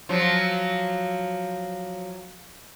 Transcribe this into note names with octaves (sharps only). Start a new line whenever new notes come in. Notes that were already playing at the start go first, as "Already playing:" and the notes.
F3 F#3